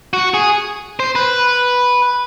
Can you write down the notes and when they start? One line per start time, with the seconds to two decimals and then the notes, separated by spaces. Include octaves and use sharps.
0.13 F#4
0.34 G#4
1.00 C5
1.15 B4